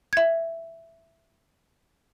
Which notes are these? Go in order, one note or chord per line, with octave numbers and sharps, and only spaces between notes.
E5 G#6